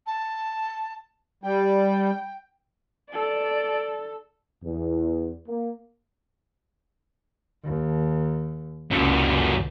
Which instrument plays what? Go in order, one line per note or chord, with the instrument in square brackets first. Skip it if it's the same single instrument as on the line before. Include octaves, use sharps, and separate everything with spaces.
[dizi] A5
[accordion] G3 [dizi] G5
[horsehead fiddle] A4 [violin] D5
[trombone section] E2
A#3
[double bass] D#2
[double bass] F1 C#2 [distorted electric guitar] F#2 A#2